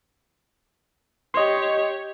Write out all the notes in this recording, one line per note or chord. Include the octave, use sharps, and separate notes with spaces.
G4 C#5 D#5 C6